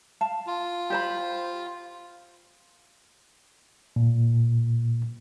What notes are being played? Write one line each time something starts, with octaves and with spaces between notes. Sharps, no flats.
F5 A5
F4
G4 C5 B5
A#2